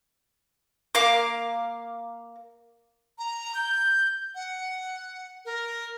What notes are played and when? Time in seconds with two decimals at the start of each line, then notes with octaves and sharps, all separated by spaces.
0.95 A#3 F5 D6
3.19 A#5
3.55 G6
4.35 F#5
5.45 A#4